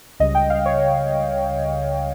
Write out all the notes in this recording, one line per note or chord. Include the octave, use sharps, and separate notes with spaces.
C#2 C#3 G3 D#5
G5
F5
C#5